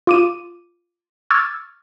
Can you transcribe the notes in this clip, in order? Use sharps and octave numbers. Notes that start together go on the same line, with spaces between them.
F4 D6 D#7
C#6 D6 E6 F6 G#6 A6